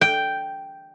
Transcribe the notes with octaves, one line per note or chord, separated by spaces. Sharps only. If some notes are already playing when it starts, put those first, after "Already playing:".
G5